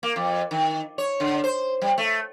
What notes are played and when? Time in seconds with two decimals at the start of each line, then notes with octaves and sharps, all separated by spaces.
0.03 A#3
0.16 F2
0.51 D#3
0.98 C#5
1.20 D3
1.44 C5
1.82 G3
1.98 A3